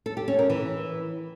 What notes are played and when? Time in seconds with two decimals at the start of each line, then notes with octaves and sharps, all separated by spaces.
0.06 A4
0.17 G4
0.28 C#4
0.39 A#4
0.50 E3